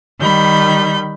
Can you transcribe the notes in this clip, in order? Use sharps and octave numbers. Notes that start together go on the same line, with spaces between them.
D#3 G3 B5 G6